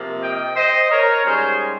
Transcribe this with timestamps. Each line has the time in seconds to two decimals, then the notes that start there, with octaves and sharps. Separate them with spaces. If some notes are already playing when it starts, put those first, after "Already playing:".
Already playing: C3 F3 A#3
0.21 D#5 G5
0.56 C5 D#5
0.90 A#4 C#5
1.24 G#2 G3 C#4 G#4 C5